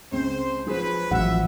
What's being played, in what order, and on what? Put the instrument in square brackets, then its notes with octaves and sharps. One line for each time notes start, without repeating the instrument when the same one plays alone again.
[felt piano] C#2 C4 [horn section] C5
[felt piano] F3 G#4 C5 [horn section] F#3 B4
[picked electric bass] A1 [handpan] F3 F#5 [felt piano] F#3 [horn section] E5